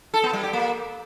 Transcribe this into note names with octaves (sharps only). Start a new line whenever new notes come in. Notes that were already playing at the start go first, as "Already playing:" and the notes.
A4
B3
G3
G4
A#3